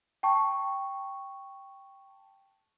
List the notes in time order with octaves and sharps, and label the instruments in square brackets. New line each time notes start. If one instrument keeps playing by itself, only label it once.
[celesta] G5 A5 C#6